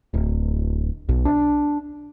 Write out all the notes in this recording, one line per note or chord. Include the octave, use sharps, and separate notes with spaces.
D1
B1
D4